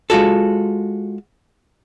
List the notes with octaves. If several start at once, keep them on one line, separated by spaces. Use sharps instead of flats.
G#3 F4 F#4 A4